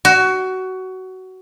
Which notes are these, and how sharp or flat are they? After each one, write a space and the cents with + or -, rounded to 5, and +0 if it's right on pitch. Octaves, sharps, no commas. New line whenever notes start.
F#4 +20